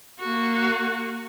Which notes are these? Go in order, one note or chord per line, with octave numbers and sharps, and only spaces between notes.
A#3 F#4